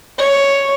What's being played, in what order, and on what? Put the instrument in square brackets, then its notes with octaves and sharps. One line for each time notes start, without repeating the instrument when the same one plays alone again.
[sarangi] C#5